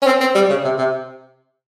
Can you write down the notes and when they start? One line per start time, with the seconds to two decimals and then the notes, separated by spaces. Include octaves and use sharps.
0.02 C#4
0.06 C4
0.20 C4
0.35 G3
0.50 C#3
0.64 C3
0.78 C3